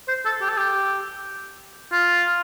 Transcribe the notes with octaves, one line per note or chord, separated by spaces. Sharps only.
C5
A4
G4
A4
G4
F4